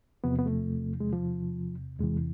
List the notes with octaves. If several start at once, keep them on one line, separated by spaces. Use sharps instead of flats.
E2 C3 F3 B3
B3
A3
G#3
F3
E2 C3 E3 G#3